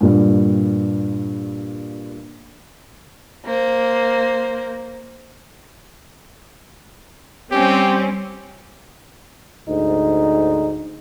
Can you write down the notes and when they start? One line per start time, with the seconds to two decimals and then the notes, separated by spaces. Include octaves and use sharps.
0.01 G2 A#2 G3
3.46 A#3 C5
7.52 G3 C4 C#4 G4
9.68 D2 G#2 D#4